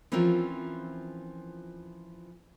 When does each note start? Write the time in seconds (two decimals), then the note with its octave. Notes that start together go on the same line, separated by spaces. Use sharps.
0.12 E3 F3 C4 C#4 F4 A#4